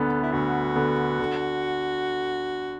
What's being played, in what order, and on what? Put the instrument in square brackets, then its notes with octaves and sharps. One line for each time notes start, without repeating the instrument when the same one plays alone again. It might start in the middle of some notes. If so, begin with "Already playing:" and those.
Already playing: [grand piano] D2 D3 B3 [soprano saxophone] A4
[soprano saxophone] E4
[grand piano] D2 [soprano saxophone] F#4
[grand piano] D3 B3
D3